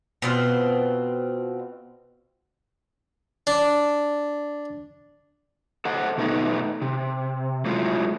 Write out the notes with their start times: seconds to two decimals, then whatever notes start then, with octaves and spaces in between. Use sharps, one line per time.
0.22 B2 C4 F4
3.47 D4
5.85 A4 C5 D#5 F#5
6.18 B2 A3 B3 D#4
6.82 C3
7.65 F#3 G#3 A3 E4 F4